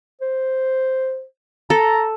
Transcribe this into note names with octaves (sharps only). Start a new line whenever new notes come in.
C5
A4 A#5